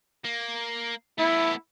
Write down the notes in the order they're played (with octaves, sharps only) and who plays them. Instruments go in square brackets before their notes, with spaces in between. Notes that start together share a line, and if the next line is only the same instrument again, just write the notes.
[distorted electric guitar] A#3
[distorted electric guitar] A3 B3 [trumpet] E4